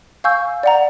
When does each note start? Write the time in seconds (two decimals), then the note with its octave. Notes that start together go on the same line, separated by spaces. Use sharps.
0.24 F5 G#5 C#6 E6 G6
0.63 D5 F#5 A#5